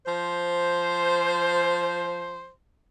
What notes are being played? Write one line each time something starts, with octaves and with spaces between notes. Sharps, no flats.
F3 C5